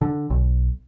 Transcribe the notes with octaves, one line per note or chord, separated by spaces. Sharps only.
D3
B1